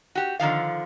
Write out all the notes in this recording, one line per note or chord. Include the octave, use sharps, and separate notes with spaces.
F#4 G4
D3 D#3 F3 F5